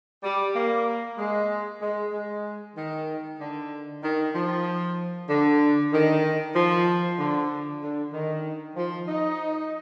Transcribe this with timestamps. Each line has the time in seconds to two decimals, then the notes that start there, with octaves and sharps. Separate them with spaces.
0.23 G3
0.55 A#3
1.18 G#3
1.82 G#3
2.13 G#3
2.76 D#3
3.39 D3
4.02 D#3
4.35 F3
5.28 D3
5.92 D#3
6.55 F3
7.18 D3
7.81 D3
8.13 D#3
8.76 F3
9.08 D#4